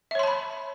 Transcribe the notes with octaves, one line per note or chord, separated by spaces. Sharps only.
C#5 E5 A5 B5 C6